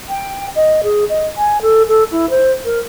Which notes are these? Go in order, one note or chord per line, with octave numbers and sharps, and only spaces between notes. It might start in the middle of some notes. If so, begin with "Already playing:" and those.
G5
D#5
G#4
D#5
G#5
A4
A4
E4
C5
A#4